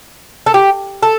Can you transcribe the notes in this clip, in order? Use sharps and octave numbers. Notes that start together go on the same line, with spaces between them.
A4
G4
A4